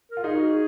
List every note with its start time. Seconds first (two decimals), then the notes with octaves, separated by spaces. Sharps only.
0.11 A#4
0.17 F4
0.23 D#4 G#4
0.35 F#4
0.47 G#4